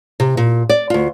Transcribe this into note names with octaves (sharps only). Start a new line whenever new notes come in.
C3
A#2
D5
D2 F4